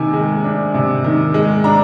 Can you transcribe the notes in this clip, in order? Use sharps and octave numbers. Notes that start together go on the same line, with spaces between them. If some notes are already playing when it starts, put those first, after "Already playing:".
Already playing: C3 D#3 G#5
G#3
D4
C3
D#3
G#3
D4 A#5